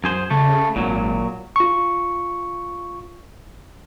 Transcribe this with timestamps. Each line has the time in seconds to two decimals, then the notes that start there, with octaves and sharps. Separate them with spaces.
0.04 F#2 G#4 C5
0.31 C#3 A3
0.76 G#1 A#2 F#3
1.56 F4 C#6